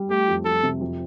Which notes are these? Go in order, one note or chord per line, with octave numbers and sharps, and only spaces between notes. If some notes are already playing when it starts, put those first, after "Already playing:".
Already playing: G3
A3 G4
F2
F3 A4
C3
F2